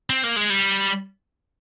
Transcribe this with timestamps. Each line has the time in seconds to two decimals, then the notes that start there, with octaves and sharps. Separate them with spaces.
0.10 C4
0.24 A#3
0.36 G#3
0.50 G3